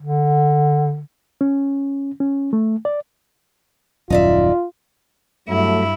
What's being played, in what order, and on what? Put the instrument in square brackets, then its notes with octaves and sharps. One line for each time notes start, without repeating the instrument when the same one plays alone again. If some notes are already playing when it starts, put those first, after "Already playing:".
[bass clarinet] D3
[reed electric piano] C#4
C#4
A3
D5
[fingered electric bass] D#1 F#2 [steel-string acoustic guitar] D#4 D5 E5 [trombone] F4
[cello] G2 E4 [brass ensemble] F#3 A3